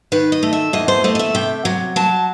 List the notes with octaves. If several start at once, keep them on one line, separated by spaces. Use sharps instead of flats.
D#3 B4
D#5
A3
E5
E2 D#5
C5
A3 D#5
D#5
E5
C3 G5
F#3
F#3 A5